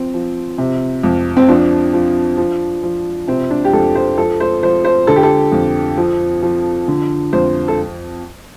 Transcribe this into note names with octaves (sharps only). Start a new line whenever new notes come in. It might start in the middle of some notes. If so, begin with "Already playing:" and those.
Already playing: F3 C4
F3
C3
F2
C4
F3 D4
F3
F3
F3
C3 C4
D4
G4
F2 A4
C5
F3 A4
C5
F3 C5
C5
D3 A4
G4
A4
F2
F3
F3
D3
F2 C5
A4